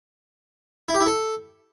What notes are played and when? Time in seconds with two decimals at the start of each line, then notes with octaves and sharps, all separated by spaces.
0.89 E4
0.94 G4
1.00 E4
1.06 A4